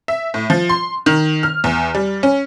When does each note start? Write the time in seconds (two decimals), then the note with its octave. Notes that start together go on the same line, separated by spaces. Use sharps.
0.08 E5
0.34 A2
0.50 F3
0.69 C6
1.06 D#3
1.43 F6
1.64 E2
1.95 G3
2.23 C#4